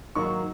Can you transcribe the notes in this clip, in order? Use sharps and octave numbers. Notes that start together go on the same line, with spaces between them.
G#2 D#3 F#3 A#3 C#6